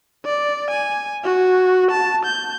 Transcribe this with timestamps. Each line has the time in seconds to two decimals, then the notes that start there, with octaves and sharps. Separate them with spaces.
0.25 D5
0.71 G#5
1.24 F#4
1.91 A5
2.25 G6